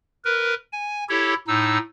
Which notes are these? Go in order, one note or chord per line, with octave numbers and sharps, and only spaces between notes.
A#4 B4
G#5
E4 G4 A4 C#5
A2 D#4 E6